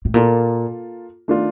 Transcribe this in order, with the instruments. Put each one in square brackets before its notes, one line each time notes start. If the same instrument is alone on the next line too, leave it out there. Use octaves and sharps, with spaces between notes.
[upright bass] A2
[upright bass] A#2 [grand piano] A#3 F4 A4
[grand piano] D#3 A3 D4 F4